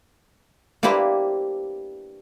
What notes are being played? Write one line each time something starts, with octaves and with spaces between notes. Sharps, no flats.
A#3 D4 E4 G4 B4 C5